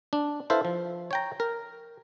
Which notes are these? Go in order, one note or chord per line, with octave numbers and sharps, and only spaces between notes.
D4
E4 A4 B4 C5 F5
F3
C#5 G5 A#5
A#4